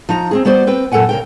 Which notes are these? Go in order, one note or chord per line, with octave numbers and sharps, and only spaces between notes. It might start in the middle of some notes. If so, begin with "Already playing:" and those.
F3 D#4 A#5
C4 C#4 G#4
G3 B3 F#4 C5 D5
C4 B4 G5
F#2 A#2 A4 A#4 F#5 G#5
C#3 A#4 G5